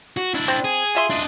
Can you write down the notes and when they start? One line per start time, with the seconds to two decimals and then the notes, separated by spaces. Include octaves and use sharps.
0.17 F#4
0.34 D4 E4
0.48 C4
0.64 G#4
0.95 F4 E5 C6
1.10 D4 D#5